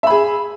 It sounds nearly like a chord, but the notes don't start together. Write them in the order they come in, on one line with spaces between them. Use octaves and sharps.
E5 B5 G#4